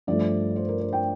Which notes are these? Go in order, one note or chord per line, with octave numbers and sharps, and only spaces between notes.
G2 F3 A3 D5
C5
A#4
C5
G5